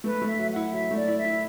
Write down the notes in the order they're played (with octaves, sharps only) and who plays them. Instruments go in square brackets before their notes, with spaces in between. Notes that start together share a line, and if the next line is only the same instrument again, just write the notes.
[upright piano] A3 [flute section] B4
[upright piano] A3
[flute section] E5
[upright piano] F#3
[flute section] F#5
[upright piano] E4
[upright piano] F#3 [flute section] E5
[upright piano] A3 [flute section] D5
[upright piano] E4
[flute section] E5
[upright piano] E4